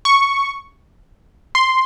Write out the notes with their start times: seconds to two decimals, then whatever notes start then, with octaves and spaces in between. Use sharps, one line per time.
0.05 C#6
1.55 C6